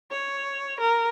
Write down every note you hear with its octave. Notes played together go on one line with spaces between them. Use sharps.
C#5
A#4